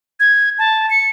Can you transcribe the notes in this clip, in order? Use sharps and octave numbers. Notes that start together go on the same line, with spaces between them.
G#6
A5
C#7